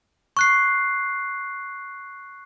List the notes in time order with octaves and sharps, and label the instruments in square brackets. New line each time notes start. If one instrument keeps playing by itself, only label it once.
[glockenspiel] C#6 F#6 C7